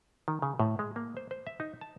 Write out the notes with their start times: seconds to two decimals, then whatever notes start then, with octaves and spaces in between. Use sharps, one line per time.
0.28 D#3
0.42 C#3
0.60 A2
0.79 G#3
0.96 A#3
1.17 C5
1.31 C5
1.47 E5
1.60 D#4
1.81 A5